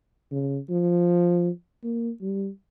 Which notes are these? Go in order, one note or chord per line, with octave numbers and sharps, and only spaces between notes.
C#3
F3
A#3
G3